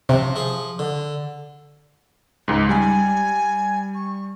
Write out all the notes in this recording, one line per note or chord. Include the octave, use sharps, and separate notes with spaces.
C3 F3
F3 G#4
D3
C#2 G#2
G3 G#5
C#6